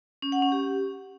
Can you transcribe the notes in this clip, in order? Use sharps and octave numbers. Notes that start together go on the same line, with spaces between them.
C#4
F#5
C#4
G4